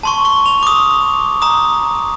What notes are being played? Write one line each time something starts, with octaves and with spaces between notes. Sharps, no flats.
A5 C6 C#6
C#6 G7
F7
D6 D#6
A#5 D#6